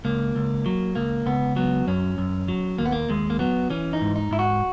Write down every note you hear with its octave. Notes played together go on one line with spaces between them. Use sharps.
C#2 A#3
C#2
F#3
C#2 A#3
C#2 B3
F#3 B3
F#2 C#4
F#2
F#3
D#2 A#3
B3
A#3
D#2 G#3
A#3
F#3 B3
E3 C#4
D#4
G#2
D#4
G#2 E4
F#4